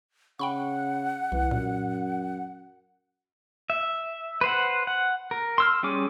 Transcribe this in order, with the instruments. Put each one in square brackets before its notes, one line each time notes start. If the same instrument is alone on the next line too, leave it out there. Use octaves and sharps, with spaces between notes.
[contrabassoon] C#3 [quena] F#5 [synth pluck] G5 B5 C#6
[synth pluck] C2 [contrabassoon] E3
[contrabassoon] F#2 [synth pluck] A#2
[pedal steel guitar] E5
B4 C5 F#5
F#5
A#4
C6 E6 F6
G3 C#4 G#4 D6